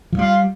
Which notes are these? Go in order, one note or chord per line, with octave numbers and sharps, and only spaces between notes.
F3
G3 F4